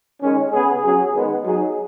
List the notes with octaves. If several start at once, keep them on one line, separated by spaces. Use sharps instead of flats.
D#3 G#3 C#4
C#3 B3 G#4
F#3 C#4 G#4
D#3 G#3 B3
F#3 D#4 G#4